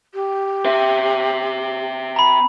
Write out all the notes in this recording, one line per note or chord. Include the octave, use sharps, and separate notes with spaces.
G4
C4 E5
A#5 B5